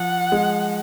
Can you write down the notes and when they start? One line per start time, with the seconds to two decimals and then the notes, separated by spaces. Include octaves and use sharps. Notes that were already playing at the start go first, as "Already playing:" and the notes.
Already playing: F3 F#5
0.32 G#3